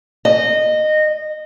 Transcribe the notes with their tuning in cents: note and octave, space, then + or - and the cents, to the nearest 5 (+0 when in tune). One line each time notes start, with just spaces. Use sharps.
D#5 -15